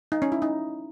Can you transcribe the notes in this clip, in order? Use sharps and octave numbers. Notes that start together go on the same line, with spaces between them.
D#4
C#4
E4
D#4